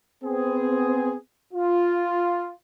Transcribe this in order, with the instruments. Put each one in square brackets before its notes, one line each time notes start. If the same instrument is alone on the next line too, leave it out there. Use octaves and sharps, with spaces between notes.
[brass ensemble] B3 C4 G#4
F4